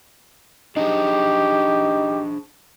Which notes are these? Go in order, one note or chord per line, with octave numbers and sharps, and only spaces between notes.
D4 D#4 G4 G#4 C5